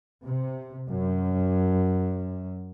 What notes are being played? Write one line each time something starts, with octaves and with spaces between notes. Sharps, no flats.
C3
F#2